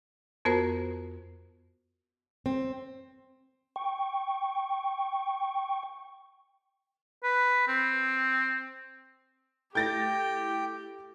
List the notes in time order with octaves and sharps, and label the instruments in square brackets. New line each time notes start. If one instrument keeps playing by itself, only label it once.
[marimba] F2 B3 F#4 A#4 C5 A#5
[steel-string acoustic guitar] C4
[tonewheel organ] G5 C#6
[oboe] B4
C4
[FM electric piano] A3 E4 A4 [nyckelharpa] G4 [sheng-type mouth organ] G5 [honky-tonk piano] G6 A6 A#6